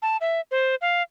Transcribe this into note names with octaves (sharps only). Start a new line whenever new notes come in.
A5
E5
C5
F5